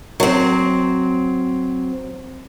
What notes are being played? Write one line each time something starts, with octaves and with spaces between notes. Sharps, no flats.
F#3 C4